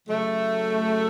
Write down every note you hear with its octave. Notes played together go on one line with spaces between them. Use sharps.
C#3 F#3 A3